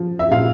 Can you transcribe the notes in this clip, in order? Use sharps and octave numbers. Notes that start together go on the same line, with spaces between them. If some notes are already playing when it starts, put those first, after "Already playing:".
Already playing: F3
E5
A#2 F5